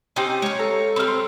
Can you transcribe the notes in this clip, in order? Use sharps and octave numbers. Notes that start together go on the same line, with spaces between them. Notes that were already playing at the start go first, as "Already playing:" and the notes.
C4 C#4 D#4 G4
G#3 C#5 F5
A4 A#5
G3 C4 B5 F6
C5